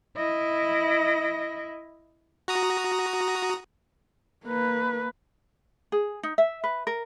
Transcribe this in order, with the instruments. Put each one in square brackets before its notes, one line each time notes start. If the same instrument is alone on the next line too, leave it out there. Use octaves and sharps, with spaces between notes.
[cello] E4 D#5
[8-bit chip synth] F#4 A#5 D#6
[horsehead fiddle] A#3 B4
[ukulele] G#4
D#4
E5
B4
A#4